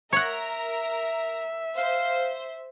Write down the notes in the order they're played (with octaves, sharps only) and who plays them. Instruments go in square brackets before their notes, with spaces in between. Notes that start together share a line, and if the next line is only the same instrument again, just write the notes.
[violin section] A#4 A#5 [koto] C#5 F#5 [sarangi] E5
[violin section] C5 [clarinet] F5